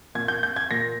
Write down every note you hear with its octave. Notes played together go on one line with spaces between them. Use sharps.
A#2 G#6
G6
G6
G#6
A#2 A#6